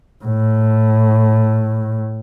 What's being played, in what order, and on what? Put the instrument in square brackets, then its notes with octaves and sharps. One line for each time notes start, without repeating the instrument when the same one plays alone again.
[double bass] A2